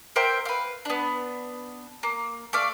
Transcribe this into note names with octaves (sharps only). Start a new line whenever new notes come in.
A#4 C5 E5 G5
B4 F5
B3 D4
A#3
A3 D5 F5